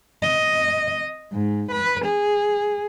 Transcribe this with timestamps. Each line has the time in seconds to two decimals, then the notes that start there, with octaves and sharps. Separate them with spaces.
0.22 D#5
1.32 G#2
1.71 B4
2.05 G#4